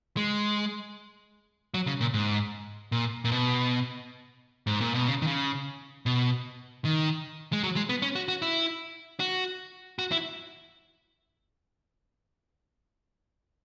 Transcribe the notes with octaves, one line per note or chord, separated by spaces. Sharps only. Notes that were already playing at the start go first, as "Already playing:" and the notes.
G#3
F#3
C#3
A#2
G#2
A#2
A#2
B2
G#2
A#2
B2
C#3
D#3
C#3
B2
D#3
G#3
F#3
G#3
B3
C#4
F#4
F#4
E4
F#4
F#4
E4